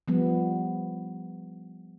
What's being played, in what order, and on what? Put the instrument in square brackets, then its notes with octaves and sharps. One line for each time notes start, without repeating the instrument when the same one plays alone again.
[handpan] F3 G3 B3